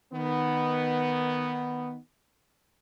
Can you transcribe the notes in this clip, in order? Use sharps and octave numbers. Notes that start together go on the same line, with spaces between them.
D#3 B3